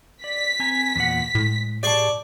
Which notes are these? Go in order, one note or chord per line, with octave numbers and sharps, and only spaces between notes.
D5 B6
C4 G#5 A#5
E2 A#2 F#5
A2 G#3
G4 G#4 D5 A5 C#6 D6